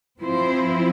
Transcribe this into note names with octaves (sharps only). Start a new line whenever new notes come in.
F3 C4 E4 C5